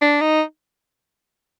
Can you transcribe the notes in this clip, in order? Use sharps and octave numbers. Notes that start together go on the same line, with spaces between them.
D4
D#4